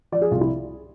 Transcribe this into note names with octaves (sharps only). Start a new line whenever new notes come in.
F3 D5
G#4
C2 F4
E4